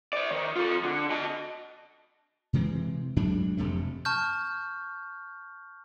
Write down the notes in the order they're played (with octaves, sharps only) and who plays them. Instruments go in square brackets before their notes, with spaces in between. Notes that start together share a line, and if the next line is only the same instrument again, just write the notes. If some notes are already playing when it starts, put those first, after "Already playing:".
[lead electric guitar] C5 D5
D#3
F4 A4
D3
D#5 A5
[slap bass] C3 E3 G#3 C4
D2 G#2 F#3 D4
F1 F2 C3 A3
[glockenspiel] A5 C#6 F6 G6